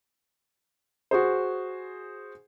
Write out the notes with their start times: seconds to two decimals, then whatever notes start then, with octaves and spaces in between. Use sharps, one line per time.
1.11 F#4 G#4 C5